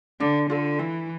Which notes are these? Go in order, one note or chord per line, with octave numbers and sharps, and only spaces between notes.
D3 D4
D3 F4 A4
E3 E4